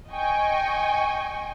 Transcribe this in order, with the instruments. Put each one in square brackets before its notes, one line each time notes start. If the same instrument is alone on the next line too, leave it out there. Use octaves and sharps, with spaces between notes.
[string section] D#5 G5 G#5 C#6